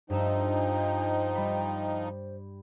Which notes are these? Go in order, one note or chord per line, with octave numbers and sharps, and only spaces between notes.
G2 F3 D#4 C5 E5 G5
G3 B5